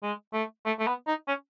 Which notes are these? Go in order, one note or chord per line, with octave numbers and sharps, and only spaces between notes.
G#3
A3
A3
A3
B3
D#4
C#4